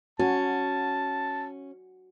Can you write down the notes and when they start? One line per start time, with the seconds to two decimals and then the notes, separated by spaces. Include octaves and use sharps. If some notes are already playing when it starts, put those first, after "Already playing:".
0.19 C#4 F#4 A5